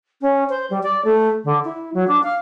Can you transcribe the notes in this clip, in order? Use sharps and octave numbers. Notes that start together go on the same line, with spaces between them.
C#4
C5
G3
D5
A3
D3
E4
F#3
D4
F5